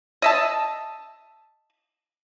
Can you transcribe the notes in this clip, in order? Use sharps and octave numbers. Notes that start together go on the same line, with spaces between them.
D#5 E5 A5